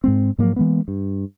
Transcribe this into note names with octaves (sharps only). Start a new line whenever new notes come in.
G#2 G#3 C4
G#2 F3 F#3 A#3
E3 G#3 A#3 B3
G2